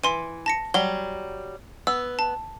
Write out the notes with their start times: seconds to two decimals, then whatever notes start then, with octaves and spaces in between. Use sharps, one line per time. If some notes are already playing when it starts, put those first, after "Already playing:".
0.04 E3 C6 D#7
0.46 A5 A#6 C#7
0.74 F#3 G3 G7
1.87 B3 E6
2.19 A5